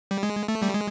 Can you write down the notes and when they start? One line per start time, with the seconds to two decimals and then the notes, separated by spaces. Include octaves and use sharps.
0.11 G3
0.23 G#3
0.48 A3
0.63 G3
0.74 G#3